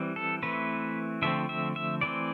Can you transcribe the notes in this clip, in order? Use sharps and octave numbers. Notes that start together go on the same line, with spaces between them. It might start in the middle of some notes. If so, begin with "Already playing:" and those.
Already playing: E3 G3 C4
A4
E3 A3 C4 B4
D3 F3 A3 C4 E5
E5
E5
E3 A3 C4 D5